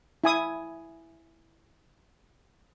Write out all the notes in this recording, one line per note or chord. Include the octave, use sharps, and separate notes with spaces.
E4 G#5 D#6